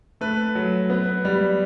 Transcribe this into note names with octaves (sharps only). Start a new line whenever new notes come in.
A3 B4
F#3
B3
G3